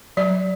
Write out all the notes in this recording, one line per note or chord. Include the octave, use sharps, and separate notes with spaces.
F#3 D5